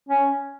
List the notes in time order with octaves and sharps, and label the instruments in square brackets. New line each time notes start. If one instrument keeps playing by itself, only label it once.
[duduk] C#4